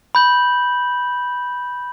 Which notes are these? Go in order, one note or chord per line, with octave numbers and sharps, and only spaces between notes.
B5 G6 F#7